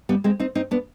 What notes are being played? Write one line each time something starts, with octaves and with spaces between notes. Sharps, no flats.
G3 B3
G#3 C4
C4 D#4
C4 D#4
B3 D4